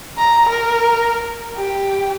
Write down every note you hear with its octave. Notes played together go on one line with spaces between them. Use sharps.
A#5
A#4
G4